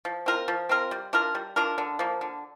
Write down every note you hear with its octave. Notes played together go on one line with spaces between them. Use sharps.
F3
C4 F4 A#4
F3
C4 F4 A#4
G3
D4 F4 A#4
G3
D4 F4 A#4
D3
F3 A#3
D3